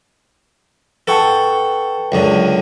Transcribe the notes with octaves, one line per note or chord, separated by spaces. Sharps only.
A4 B4 F#5 G5 A5 C#6
C#2 F#2 D3